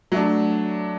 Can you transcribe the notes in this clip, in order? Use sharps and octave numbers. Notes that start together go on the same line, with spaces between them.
F#3 A3 D4